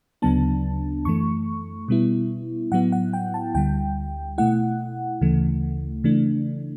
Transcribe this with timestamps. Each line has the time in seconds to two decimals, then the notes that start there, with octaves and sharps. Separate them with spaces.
0.22 D2 C#3 F#3 B3 D4 A5
1.05 F#2 E3 A3 C#6
1.88 B2 G3 B3 E4
2.72 A2 F#3 B3 E4 F#5
2.92 F#5
3.13 G5
3.34 A5
3.55 D2 D3 G3 G5
4.38 B2 A3 E4 F#5
5.21 D2 C#3 E3 A3
6.04 C#3 E3 A3 D4